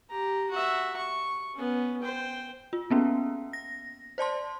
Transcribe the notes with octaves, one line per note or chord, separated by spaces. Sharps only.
G4 A#5
F#4 E5
C#6
B3 C#4
C5 G5
F4
A#3 B3 C#4
A#6
C5 D5 A5 C6